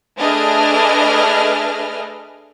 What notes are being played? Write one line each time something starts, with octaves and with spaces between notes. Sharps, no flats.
A3 D4 G#4 B4 D#5 F6